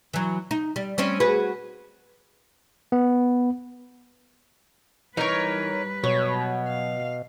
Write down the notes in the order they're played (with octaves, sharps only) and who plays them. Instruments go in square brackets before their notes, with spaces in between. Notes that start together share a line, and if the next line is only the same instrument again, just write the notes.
[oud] E3 F#3
D#4
G3
G3 C4 C#4
F#4 G#4 B4
[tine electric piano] B3
[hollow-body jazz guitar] E3 [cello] G3 B4 [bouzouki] D#4 A#4 C#5
[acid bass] B2 [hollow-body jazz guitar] F#3 [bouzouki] C#5
[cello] F5